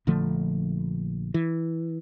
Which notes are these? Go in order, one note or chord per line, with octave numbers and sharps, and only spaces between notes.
A#1 D3 F3 A3
E3